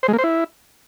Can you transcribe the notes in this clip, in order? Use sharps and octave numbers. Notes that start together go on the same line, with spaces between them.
C5
G#3
A#3
C5
E4